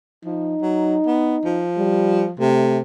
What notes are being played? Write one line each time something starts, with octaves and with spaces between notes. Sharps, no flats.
F3 D#4
F#3
B3
F3
G3
C3 A3